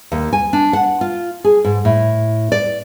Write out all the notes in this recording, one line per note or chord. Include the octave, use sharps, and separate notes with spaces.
D#2
G#5
D4
F#5
F4
G#4
G#2
A2
D5